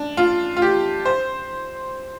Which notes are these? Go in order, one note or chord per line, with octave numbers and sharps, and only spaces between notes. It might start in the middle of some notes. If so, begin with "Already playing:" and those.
Already playing: D4
F4
F4
G4
C5